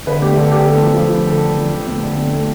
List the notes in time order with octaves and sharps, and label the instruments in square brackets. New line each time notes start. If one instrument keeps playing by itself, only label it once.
[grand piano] D3 B4
A3 G4
D3 A4
D3 G4
A3 A4
F3
F3
D3
D3 A4
D3
F3
D3
A3
D3
A3
A3